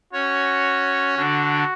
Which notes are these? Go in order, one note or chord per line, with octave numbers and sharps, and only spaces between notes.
C#4 F#4 C#5
D3 D4 F#4